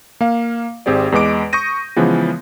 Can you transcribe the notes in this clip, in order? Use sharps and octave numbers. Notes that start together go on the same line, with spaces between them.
A#3 F5
G#1 C4 G4 G#4 D5
E2 G#3 B4 D#5 D6 D7
C#6 D#6 G6 A#6 D#7
C#3 E3 F3 G#3 B3